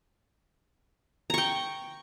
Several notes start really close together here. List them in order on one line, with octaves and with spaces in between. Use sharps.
A#5 C#6 G5